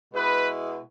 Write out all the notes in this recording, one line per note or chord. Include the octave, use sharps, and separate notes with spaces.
B2 G#3 E4 B4